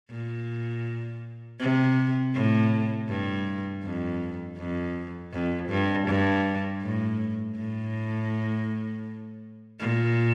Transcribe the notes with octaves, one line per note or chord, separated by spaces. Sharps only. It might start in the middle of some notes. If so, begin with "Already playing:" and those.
A#2
C3
A2
G2
F2
F2
F2
G2
G2
A2
A2
A#2